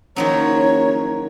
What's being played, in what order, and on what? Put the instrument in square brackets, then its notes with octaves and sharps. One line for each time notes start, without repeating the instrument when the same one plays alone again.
[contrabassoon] F#1 [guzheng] D#3 F3 F#3 [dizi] C#5 [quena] A#5